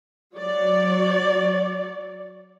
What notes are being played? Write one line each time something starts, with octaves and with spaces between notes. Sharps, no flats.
F#3 C#5 D5